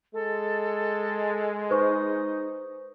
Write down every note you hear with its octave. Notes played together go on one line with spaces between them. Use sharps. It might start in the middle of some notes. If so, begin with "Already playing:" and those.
G#3 A4
D#4 B4 C5 C#6